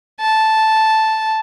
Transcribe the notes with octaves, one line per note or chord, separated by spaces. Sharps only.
A5